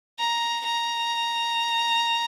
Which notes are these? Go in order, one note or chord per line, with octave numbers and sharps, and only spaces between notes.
A#5
A#5